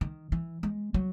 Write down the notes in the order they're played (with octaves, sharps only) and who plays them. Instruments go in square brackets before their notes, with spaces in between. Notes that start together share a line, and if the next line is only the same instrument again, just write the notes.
[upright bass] D#3
E3
G#3
F#3